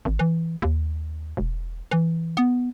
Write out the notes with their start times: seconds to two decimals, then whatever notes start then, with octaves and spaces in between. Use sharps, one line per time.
0.05 G#1
0.19 E3
0.62 D#2
1.37 E1
1.91 E3
2.37 B3